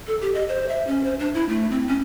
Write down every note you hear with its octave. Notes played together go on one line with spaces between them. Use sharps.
A4
G4
D#5
C5
E5
C#4
C5
D4
E4
A3
C4
C#4